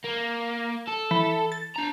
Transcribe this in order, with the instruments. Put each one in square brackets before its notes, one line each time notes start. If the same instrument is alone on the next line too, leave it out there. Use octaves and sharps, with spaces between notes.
[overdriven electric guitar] A#3
A4
[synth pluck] E3
A6
[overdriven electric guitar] D4 A#5